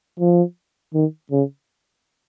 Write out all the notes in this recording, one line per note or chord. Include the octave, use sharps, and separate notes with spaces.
F3
D#3
C#3